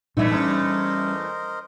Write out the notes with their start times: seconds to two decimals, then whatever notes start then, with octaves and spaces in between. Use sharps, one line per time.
0.17 E2 A#2 E3 G3 A3 D4 D#4 E5
0.32 G3 A#3 C#4 A#4 C5 D#5 A5